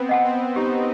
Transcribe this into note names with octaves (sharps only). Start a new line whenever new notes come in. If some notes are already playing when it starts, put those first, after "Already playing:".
Already playing: B3 C4
D#5 F#5 A5
C4
D#4 G4